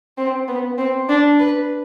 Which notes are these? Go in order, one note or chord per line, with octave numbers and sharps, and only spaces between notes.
C4
B3
C4
D4
B4